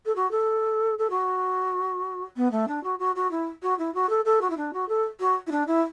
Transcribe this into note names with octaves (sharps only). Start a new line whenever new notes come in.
A4
F#4
A4
A4
F#4
B3
A3
D4
F#4
F#4
F#4
E4
F#4
E4
F#4
A4
A4
F#4
E4
D4
F#4
A4
F#4
E4
D4
E4